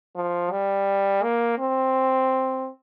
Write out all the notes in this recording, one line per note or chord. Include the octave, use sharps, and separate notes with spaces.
F3
G3
A#3
C4